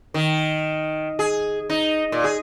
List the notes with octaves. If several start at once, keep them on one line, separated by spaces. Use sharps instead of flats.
D#3
G#4
D#4
A#2
G#4